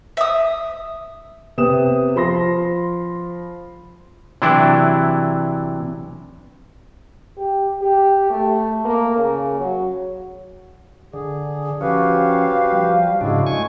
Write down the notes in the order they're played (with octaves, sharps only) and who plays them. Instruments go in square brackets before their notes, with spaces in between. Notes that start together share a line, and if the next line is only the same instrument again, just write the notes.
[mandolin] E5 D#6
[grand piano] C3 B3 D#6 E7
F3 B5 C6 A#6
[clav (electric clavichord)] C3 E3 F#3 D4 E4
[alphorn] G4
G4
A3
A#3
C#3
F#3
[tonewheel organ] D3 [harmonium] G#4
[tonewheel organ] F3 C#4 [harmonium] F#4 G4 B4 [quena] F5
[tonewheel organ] F3 G3
[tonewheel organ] G#2 C#3 D4 [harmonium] G#3 E4 F#4
[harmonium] G#3 A3 [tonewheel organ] G#5 C#6